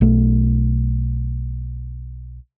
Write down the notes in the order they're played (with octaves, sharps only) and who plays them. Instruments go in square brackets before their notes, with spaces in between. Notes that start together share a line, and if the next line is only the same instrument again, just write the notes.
[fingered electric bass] B1 A3